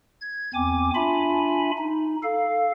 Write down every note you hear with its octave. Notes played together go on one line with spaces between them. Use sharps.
G#6
E2 C4 G#5 D6
D4 F4 E5 G#5 B5
D#4
A4 F5